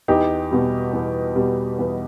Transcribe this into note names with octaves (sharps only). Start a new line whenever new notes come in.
E2 D#4 G4
B2 G3
E2
B2 G3
E2